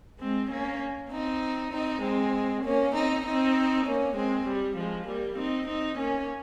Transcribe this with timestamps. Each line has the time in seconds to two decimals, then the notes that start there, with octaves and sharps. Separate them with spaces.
0.20 G#3 C4
0.50 A#3 C#4
1.11 C4 D#4
1.72 C4 D#4
2.03 G#3 C4
2.64 A#3 C#4
2.94 C4 D#4
3.25 C4 D#4
3.86 A#3 C#4
4.16 G#3 C4
4.47 G3
4.77 F3 G#3
5.07 G3 A#3
5.38 C4 D#4
5.69 C4 D#4
5.99 A#3 C#4